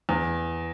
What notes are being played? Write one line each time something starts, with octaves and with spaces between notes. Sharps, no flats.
E2